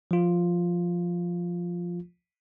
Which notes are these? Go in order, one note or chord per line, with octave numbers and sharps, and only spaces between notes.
F3 F4